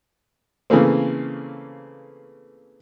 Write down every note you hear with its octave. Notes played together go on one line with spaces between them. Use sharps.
C#3 E3 A3 A#3 C4